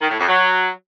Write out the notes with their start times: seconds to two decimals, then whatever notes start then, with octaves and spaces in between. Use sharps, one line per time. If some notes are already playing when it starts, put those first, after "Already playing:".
0.02 D#3
0.10 A2
0.19 F2
0.28 F#3